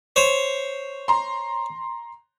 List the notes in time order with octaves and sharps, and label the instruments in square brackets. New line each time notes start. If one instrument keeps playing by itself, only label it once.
[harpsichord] C5 C#5
[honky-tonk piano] A#5 C6